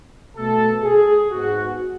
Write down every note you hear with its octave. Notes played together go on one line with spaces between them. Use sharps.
B2 A3 A4
G#4
G#2 G#3 B3 F#4